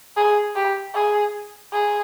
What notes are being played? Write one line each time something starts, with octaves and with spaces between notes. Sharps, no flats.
G#4
G4
G#4
G#4